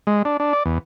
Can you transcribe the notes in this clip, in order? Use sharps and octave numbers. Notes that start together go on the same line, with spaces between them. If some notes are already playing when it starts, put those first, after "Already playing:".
G#3
D4
D4
D5
E2